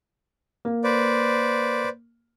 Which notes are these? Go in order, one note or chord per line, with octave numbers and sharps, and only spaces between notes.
A#3
B4 C5 D5